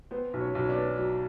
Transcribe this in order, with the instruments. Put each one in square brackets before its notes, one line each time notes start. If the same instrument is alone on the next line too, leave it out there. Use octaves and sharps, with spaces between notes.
[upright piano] B3 [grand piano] C4 C5
[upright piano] B1
[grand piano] C#4 C#5
[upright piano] B1
[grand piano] C#5
D4 D5
[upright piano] B3
F#3